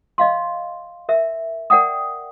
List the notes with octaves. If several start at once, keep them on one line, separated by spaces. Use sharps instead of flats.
D#5 F5 C6
A#4 E5
A#4 D5 F#5 G5 D#6